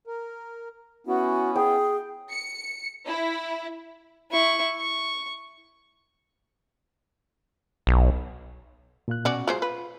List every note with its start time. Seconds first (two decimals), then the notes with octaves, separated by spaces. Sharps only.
0.07 A#4
1.07 B3 C#4 E4 F#4
1.56 G#4 G5
2.32 C#7
3.07 E4
4.31 E4 C#6
4.76 C#6
7.87 B1
9.08 A#2 F4 F#6
9.25 B2 C#4 F#4 D5
9.48 F#3 G#3 F4 C5
9.62 B4